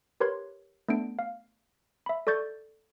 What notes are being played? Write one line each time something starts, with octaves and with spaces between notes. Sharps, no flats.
G4 A#4 B4 C#5 C6 G#6
A3 B3 D4 D7
F5
E5 B5
A4 D5 C#6 G6 A6